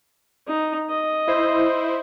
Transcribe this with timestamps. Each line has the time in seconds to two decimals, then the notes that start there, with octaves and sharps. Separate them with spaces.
0.47 D#4
0.90 D#5
1.28 E4 C5